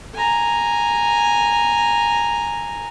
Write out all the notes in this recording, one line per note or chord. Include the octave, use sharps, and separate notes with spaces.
G#5 A#5